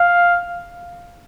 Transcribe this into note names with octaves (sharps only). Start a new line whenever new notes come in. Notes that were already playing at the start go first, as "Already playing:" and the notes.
Already playing: F5